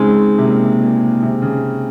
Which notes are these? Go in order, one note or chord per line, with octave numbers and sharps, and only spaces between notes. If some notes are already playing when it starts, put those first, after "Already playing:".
Already playing: C#3 G#3 C4 D#4
C3
A#2
A#2
C3
C#3